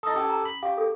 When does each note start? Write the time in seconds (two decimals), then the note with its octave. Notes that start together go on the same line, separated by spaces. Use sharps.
0.03 E4 A4 D#5 D#6
0.15 C#4 G4 A4
0.30 A#5
0.45 B5
0.63 G4 F5 C#6
0.77 G#4 A4